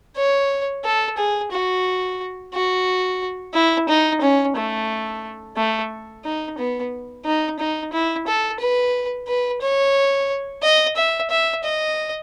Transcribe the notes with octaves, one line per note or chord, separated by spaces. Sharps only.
C#5
A4
G#4
F#4
F#4
E4
D#4
C#4
A3
A3
D#4
B3
D#4
D#4
E4
A4
B4
B4
C#5
D#5
E5
E5
D#5